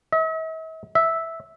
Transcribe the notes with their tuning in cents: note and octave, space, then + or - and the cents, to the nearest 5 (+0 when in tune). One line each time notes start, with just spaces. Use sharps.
E5 -45
E5 -5